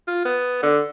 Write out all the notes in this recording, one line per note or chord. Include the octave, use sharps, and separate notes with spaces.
F4
B3
D3